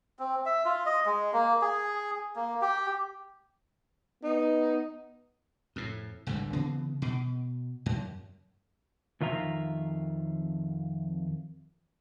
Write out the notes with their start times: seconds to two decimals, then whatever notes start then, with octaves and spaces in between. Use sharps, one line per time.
0.19 C4
0.46 E5
0.65 F4
0.86 D#5
1.06 G#3
1.33 A#3
1.62 G#4
2.36 A#3
2.62 G4
4.23 B3 D#4
5.76 F2 A2
6.27 G#1 C#2 D3 G3
6.53 C#3 E3 B3 C4
7.02 B2
7.86 F#2
9.21 F2 D#3 F4 E5 A#5